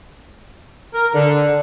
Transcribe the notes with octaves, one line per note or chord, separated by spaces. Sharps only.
A#4
D3